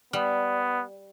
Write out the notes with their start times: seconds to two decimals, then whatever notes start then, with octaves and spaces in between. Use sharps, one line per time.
0.13 G3 B3